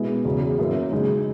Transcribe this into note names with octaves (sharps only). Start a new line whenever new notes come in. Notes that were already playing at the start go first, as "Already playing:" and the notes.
Already playing: B2 G#3 B3 E4
E2 C#3 F#3
F#2 E3 A#3 C#4
F#2 C#3 G#3 D#4